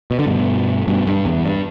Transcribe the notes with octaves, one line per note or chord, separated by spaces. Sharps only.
B2
D3
G2 B2
G2 B2
G2
E2
G2